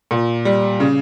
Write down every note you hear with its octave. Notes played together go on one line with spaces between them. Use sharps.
A#2
G3
C#3